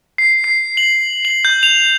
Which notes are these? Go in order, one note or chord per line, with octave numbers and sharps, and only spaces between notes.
C7
C7
F#7
F#7
G6
F7